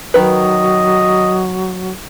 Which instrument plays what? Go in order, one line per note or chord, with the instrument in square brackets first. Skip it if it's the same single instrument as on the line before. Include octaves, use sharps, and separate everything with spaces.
[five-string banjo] D#3 B4 [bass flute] F#3 [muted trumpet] D#5